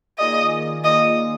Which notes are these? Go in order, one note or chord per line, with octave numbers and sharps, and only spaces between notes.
D#3 A#3 F4 G#4 D5 D#5
D#3 A#3 F4 G#4 D5 D#5